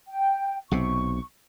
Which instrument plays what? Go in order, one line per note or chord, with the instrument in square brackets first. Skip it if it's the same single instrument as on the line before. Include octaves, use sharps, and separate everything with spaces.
[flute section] G5
[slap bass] B1 C3 [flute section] C#6